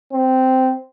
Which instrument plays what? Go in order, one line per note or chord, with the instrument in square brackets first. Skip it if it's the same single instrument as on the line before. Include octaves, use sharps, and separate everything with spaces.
[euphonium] C4